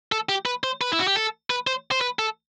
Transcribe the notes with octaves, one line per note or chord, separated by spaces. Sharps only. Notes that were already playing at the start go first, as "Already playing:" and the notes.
A4
G4
B4
C5
B4
E4
F#4
G4
A4
B4
C5
C5
B4
A4